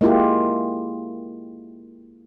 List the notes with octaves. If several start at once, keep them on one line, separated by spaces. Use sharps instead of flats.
G#3 A#3 E4 F4 G4